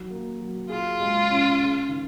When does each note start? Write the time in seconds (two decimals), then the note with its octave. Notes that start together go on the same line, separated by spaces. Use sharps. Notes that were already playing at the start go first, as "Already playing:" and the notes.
Already playing: D#3 F#3
0.11 A#3
0.41 F#3
0.70 F4 G#4
1.00 G#3
1.30 C#4
1.59 C#4
1.89 D#3